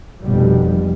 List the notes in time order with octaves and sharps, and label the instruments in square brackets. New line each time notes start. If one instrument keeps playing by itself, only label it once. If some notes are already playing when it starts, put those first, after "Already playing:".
[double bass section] F1 B2 G3